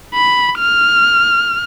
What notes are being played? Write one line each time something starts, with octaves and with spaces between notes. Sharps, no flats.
B5
F6